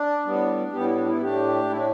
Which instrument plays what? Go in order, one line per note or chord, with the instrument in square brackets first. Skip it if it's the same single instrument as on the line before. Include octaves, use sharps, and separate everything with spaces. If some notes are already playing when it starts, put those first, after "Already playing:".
Already playing: [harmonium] D4
A2 G3 B3
A2 G3 B3 G4
E4
D4
B3 E4
A2 A3 D4 G4
A2 A3 E4
D4